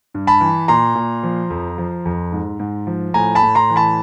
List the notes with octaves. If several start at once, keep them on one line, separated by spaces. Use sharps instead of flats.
G2
A5 B5
E3
A#2 A#5 C6
A#2
F3
F2
F3
F2
G#2
G#2
F3
A2 G#5 A#5
A5 B5
A2
A#5 C6
E3
A5 B5